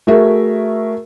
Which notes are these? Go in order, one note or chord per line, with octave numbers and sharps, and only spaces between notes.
A3 F#4 G#4 A#4 E5